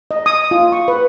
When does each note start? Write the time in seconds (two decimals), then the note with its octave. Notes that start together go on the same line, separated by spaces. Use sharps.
0.11 D#5
0.26 D#6
0.51 F4
0.72 C#6
0.88 B4